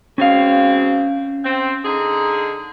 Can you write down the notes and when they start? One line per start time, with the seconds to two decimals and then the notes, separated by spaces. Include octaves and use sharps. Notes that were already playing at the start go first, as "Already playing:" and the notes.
0.18 B2 G#3 C4 C#4 F5
1.44 C4
1.84 D3 D#4 G#4